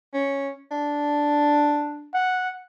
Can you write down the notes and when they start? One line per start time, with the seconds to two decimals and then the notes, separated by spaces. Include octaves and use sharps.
0.14 C#4
0.71 D4
2.14 F#5